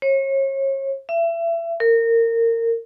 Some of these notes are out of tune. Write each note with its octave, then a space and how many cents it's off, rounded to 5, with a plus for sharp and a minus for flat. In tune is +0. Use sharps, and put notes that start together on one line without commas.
C#5 -35
E5 +30
A#4 -25